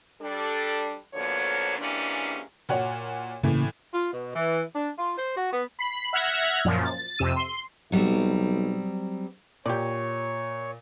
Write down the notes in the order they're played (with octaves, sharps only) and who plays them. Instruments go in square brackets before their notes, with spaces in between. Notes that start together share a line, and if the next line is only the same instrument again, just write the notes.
[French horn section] G3 D4 A4
F2 B2 D3 F3 A#3 C#5
G#2 C3 E3 A#3 C#4 D4
[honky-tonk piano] A#2 F#4 C#5
[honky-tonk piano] A2 E3 [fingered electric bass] C#3 A#3
[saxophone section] F4
B2
E3
D4
F4
C5
F#4
B3
[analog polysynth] B5 C7
E5 F#5 F6 F#6 G#6 A#6
F#2 A#2 F3
A6
F2 C3 E6 D#7
C6
[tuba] B1 [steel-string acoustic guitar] F#3 G3 C4
[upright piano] A#2 [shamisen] G4 D5 [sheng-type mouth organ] C#5